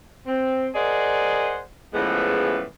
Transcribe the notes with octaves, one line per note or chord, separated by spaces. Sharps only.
C4
G#4 A#4 C5 D5 D#5 F#5
A2 C#3 E3 F3 G#3 B3